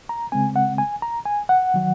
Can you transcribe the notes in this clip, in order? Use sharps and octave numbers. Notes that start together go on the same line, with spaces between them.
A#5
C#3 G#3 C4 G#5
F#5
G#5
A#5
G#5
F#5
D#3 F#3